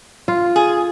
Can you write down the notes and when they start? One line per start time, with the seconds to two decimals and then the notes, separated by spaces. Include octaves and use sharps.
0.28 F4
0.56 G#4